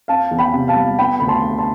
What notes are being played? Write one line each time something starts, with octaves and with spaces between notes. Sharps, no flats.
C4 F5 A5
E2
G5 B5
C3
F5 A5
G3
B3 G5 B5
D2 B5
A5 C6
D3
A5 C6